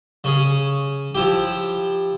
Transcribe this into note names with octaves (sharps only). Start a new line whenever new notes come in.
C#3 C#4 G#4
F3 E4 G4